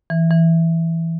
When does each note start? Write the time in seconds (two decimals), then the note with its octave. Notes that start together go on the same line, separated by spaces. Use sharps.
0.10 E3
0.31 E3